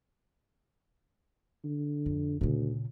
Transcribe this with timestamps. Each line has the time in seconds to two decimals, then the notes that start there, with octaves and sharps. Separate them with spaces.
1.64 D3
2.06 F2
2.41 D2 A#2 C#3